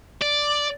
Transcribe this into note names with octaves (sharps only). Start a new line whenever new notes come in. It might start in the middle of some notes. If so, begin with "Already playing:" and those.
D5